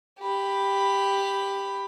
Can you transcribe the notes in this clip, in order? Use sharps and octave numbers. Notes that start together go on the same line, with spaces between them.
G4 B5